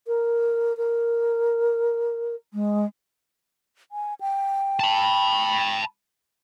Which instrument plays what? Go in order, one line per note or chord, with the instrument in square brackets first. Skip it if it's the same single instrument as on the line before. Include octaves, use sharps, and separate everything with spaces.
[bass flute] A#4
A#4
G#3
[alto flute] G#5
G5
[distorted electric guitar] A5 B5